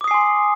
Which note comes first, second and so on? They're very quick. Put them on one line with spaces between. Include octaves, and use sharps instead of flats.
D6 D#6 C7 G#5 C6